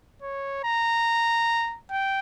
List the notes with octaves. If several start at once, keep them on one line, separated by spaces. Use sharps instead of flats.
C#5
A#5
G5